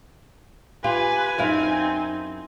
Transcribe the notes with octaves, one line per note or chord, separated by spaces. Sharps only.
F4 G4 B4 G#5
F#2 C4 D#4 E4 F5